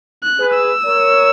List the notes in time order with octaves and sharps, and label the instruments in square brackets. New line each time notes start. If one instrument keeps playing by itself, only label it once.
[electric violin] F#6
[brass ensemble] G#4 B4
[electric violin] E6
[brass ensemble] A#4 C#5